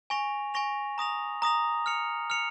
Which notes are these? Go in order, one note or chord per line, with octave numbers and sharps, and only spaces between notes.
G#5 C#6 A#6 F7
G#5 C#6 A#6 F7
A#5 D#6 A#6 F7
A#5 D#6 A#6 F7
F6 C#7 F7
F6 C#7 F7